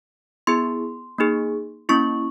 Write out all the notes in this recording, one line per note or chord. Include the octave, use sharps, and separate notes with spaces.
B3 E4 G#4 C6
A#3 D#4 G#4
A#3 C#4 E4 C#6